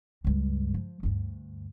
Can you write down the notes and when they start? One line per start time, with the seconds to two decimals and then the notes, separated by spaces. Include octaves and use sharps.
0.24 C#2 G2
0.74 F3
1.03 D2 G2